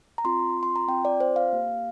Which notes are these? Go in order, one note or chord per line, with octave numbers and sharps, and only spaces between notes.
A#5
C4 F4 C6
C6
A#5
C4 F4 G5
D5
C5
F5
A#3 G4